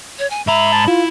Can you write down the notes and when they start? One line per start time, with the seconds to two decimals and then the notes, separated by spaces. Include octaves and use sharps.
0.19 C#5
0.30 G#5
0.47 G#2 E5 A#5 B5
0.72 A5
0.88 E4 F4